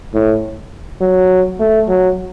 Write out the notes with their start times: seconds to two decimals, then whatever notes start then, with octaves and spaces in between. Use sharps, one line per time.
0.14 A2
1.01 F#3
1.60 A3
1.88 F#3